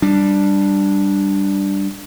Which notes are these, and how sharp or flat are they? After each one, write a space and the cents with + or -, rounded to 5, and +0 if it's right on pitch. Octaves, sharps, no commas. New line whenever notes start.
G3 +0 D4 +0